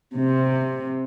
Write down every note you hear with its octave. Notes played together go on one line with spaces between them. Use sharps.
C3